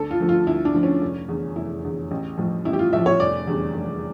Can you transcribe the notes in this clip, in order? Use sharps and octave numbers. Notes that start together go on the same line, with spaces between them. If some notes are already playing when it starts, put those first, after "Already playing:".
Already playing: D2 A4
F4
D3 F3 A3
F4
D2 E4
D4
D3 F3 A3
C#4
F1
E2 D3
F1 E4
E2 D3
A1
A2 F3
A1 E4
G4
F4
A2 F3 E5
C#5
F1 D5
E2 D3 G3
F1